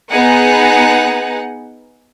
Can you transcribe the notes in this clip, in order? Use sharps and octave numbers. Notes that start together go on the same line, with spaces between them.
B3 D#4 G#4 F#5